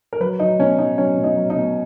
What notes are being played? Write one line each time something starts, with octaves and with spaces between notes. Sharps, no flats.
A#4
F#3 B4
F#3 D#4
B2 C#4
F#3 D#4
F#3 C#4
B2
D#4
F#3
D#4
B2